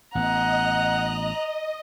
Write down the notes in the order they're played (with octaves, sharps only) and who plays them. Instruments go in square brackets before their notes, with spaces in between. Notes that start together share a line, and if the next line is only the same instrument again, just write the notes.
[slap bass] A1 B3 [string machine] D#5 [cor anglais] F#5 [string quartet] A#5 F#6